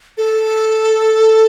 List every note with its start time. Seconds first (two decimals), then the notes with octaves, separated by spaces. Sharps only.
0.18 A4